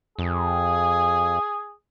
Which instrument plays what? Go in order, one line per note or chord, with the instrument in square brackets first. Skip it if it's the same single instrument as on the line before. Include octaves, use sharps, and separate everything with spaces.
[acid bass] F2 [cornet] G#4